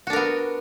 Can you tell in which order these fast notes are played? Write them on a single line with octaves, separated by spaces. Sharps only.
F#4 D4 A#4 B3